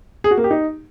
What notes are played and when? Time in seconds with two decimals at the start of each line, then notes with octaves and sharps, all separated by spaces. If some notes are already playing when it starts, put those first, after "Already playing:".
0.24 G#4
0.31 F#4
0.37 A#3
0.44 G4
0.51 D#4